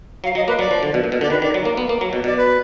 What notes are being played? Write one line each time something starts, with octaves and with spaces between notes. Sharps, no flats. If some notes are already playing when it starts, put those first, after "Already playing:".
F#3 F5
F#3 D#5
A#3 B4
F#3 D5
F3
D3
B2
A#2
B2
D3 D5
D#3 B4
D#3 D5
F#3
A#3
B3
A#3
F#3
B2
B2 D5
B4